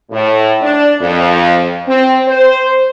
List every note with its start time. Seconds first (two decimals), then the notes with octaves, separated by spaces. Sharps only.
0.11 A2
0.63 D4
1.01 F2
1.88 C4
2.28 C5